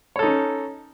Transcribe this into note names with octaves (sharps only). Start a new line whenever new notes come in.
C#4 D#4 A4 C#5